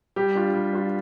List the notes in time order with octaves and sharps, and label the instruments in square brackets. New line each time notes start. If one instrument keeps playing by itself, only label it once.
[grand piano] G3 G4
D4 F4
G3
D4 F4